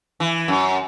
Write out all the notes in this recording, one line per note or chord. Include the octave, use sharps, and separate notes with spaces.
E3
F#2